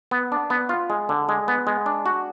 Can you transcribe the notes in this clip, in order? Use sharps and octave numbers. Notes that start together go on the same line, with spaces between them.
B3
D4
B3
F4
G#3
D3
G#3
B3
G#3
D4
F#4